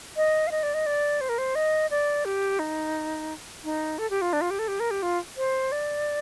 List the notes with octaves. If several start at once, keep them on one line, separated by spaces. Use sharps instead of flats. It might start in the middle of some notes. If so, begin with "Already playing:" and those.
D#5
F5
D#5
D5
D#5
D5
C5
A#4
C5
D#5
D5
G4
D#4
D#4
A4
G4
F4
D4
F4
G4
A4
G4
A#4
G4
F4
C5
D5